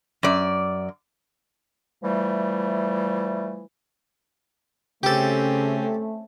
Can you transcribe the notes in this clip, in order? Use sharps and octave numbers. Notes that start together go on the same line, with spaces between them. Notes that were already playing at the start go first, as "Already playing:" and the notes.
F#2 D5
E3 F3 G3 A3
C#3 A3 C4 C#4 G4 A4